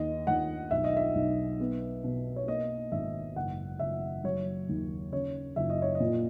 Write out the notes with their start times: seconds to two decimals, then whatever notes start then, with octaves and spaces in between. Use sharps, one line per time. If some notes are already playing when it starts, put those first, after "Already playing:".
Already playing: D#2 D#5
0.27 D#2 F#5
0.71 B1 E5
0.84 D#5
0.97 E5
1.15 B1
1.60 B3
2.04 B2
2.36 C#5
2.47 A#3 D#5
2.92 G#1 E5
3.36 F#1 F#5
3.79 F#1 E5
4.24 F#3 C#5
4.69 D#2
5.12 C#3 C#5
5.56 F#1 E5
5.70 D#5
5.82 C#5
5.95 D#5
6.00 A#2